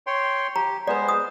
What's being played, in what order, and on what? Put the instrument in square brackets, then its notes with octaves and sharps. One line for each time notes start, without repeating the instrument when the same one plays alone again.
[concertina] C#5 G5 C6
[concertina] G4 [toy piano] A#5
[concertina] G#3 B3 C5 [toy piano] B4 D5
[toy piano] D#6